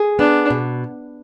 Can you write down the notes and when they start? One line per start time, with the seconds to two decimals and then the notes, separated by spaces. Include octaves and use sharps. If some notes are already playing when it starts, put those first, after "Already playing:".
Already playing: G#4
0.19 B3 D4
0.50 B2